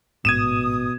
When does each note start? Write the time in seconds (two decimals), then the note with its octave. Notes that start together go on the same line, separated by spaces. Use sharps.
0.25 A1 G#2 B2 D#6 G#6 D#7 E7